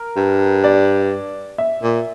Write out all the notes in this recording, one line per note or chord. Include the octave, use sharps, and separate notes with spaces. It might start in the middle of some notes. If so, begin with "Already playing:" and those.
Already playing: A#4
G2
D5
E5
A#2